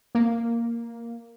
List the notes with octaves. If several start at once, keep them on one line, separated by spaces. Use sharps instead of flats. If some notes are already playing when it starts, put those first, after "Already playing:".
A#3